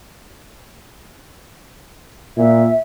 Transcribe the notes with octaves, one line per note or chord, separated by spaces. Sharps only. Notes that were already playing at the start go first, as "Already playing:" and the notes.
A#2 E5